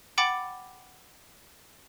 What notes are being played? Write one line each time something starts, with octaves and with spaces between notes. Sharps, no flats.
F#5 G5 B5 D6 A6